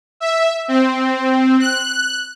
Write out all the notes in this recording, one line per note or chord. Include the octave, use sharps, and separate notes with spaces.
E5
C4
F#6